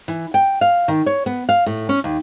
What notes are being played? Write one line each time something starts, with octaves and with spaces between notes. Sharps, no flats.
E3
G5
F5
D#3
C#5
B3
F5
A2
C#4
D#2